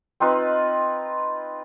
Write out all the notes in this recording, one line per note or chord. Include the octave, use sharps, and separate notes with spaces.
C4 D#4 F4 B4